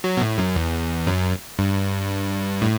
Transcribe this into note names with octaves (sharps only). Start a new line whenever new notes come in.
F#3
B2
A2
F#2
E2
F#2
G2
A2